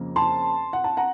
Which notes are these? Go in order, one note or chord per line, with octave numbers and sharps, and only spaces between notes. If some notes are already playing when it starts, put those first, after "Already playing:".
Already playing: F2 C#3 F3 A#3
A5 C6
F#5
A5
F#5 A#5